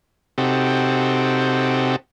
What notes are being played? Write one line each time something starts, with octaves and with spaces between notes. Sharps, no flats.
C3 C4 D#4 F#4 G4 A4